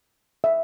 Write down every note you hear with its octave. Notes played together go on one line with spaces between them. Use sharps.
E5